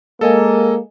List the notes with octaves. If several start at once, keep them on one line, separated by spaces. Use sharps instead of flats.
G#3 A#3 A4 D#5 G#5